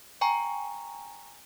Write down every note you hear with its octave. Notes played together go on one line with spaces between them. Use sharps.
G5 G#5 A#5 C#6